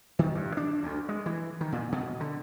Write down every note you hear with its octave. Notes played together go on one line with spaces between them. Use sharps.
D#3
G2
D4
D2
G#3
E3
D#3
A#2
B2
D3